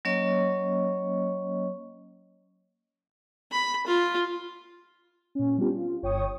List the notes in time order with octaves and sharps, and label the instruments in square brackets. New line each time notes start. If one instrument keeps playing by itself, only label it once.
[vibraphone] F#3 A#3 C#4 C#5 D#5 C#6
[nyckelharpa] B5
F4
[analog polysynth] A#2 C#4
G3 B3 D4 F4 G4
F4
G1 C#5 G5 C#6 D#6